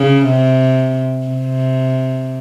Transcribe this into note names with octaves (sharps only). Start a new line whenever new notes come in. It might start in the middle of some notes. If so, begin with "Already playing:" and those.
Already playing: C#3
C3
C3